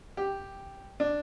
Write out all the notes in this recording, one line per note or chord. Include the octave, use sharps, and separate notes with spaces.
G4
D4